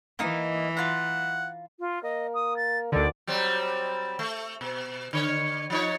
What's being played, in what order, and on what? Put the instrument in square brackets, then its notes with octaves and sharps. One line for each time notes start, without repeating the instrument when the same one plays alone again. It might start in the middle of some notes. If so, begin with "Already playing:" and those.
[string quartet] E3 [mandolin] A#3 D#4 D#5
[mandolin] F4 A#5 [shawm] F#5
[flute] F4
[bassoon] A#3 [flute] D#5
[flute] D#6
A6
[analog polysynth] D2 D3 [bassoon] D#3 [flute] D5
[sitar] F#3 G3 C4
A3
B2
D3 C#5
F3 D#4 C#5